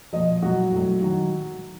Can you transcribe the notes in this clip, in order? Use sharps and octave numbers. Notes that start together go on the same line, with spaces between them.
A#2 F3 D#5
A#2 F#3 F#4
A2 F#3
D#3 F#3 F#4